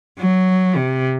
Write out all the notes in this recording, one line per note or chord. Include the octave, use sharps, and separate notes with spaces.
F#3
C3